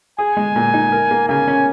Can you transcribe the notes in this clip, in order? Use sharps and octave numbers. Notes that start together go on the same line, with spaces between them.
G#4 G#5
G#3
A#2
D#4
A#4
A#3
C#3 G#5
C#4